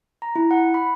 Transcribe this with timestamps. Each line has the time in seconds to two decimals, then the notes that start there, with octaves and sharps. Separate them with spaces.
0.22 A#5
0.36 E4
0.51 F#5
0.74 B5